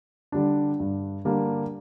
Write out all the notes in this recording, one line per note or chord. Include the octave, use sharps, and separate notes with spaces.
D3 G3 D4
G2
D3 G3 A#3 D4